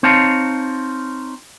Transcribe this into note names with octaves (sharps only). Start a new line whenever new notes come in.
C4 D#4 C#5 F5 A5